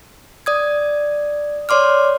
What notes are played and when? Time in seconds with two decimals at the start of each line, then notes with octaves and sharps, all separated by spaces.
0.46 D5 D#6 G#6
1.69 C#5 D5 C6 D6 F6